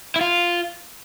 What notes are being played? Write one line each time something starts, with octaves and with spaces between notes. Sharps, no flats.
E4
F4